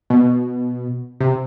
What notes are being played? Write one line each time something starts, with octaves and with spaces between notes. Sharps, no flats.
B2
C3